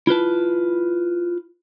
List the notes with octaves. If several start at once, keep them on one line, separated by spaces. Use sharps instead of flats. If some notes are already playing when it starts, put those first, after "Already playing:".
E4 F4 B4 A5